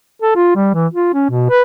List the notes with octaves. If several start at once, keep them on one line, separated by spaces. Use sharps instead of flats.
A4
F4
G3
E3
F4
C#4
B2
B4